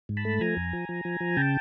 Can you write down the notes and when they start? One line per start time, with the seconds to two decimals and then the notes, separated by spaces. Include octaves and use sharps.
0.09 G#2
0.17 A5 B5
0.25 A3
0.41 F3 G#5 A#5
0.57 F2
0.73 F3
0.89 F3
1.05 F3
1.21 F3
1.37 C#3 G5 A5